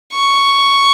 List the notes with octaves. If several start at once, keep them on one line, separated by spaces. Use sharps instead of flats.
C#6